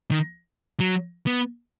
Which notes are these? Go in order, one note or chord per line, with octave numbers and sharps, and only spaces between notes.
D#3
F#3
B3